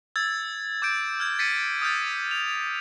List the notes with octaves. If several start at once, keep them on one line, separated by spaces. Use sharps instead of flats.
E6 G#6 A6
D6 G6 D7
F6 G#6
A6 B6 C#7 D#7
D#6 F6 G6 A6
F7